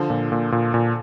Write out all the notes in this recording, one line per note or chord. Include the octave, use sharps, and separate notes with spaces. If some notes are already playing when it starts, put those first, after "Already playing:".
Already playing: D3 F3
A#2
A#2
A#2
A#2